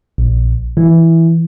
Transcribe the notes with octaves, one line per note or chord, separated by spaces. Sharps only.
A#1
E3